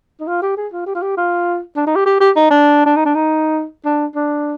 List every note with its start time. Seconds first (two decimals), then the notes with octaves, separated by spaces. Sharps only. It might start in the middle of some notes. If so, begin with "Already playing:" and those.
0.20 D#4
0.27 F4
0.42 G4
0.57 G#4
0.72 F4
0.86 G4
0.95 F4
1.02 G4
1.17 F4
1.76 D4
1.87 D#4
1.96 G4
2.06 G4
2.21 G4
2.36 D#4
2.51 D4
2.86 D4
2.96 D#4
3.05 D4
3.15 D#4
3.85 D4
4.15 D4